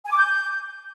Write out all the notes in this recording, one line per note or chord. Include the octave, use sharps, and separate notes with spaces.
G#5
D6
G6